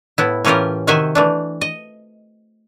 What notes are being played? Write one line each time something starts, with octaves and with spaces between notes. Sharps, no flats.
A2 B3 E4
A2 E3 C#4 F4 G4 A#4
C3 D#3 F#4 C5 E5 G#5
E3 A3 D4
D#5